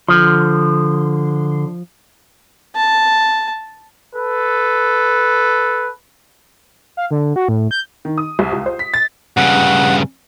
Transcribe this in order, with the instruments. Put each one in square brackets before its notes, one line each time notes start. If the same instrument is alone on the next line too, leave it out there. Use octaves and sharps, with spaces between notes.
[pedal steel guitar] D3 C6 [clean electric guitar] F3
[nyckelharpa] A5
[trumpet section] A4 B4
[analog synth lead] F5
D3
F#4
A2
G6
[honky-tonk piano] D#3
D#6
C2
C#2
C5
B6
A6
[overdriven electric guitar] G2 C#3 [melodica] F#5